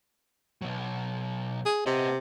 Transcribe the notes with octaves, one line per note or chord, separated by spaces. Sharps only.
B2 F#3
G#4
C3 B3 D#5